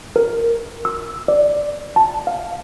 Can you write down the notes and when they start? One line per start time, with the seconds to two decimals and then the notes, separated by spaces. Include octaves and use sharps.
0.16 A#4
0.85 E6
1.28 D5
1.96 A5
2.27 F5